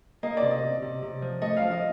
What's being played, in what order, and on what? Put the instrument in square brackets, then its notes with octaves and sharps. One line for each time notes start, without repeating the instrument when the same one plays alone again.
[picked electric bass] A#3 [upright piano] D#5
[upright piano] D5
[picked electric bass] C3
[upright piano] D#5
[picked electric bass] C3
C3
C3
F3
[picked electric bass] A3 [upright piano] D#5
[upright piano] F5
[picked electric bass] F3
[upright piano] D#5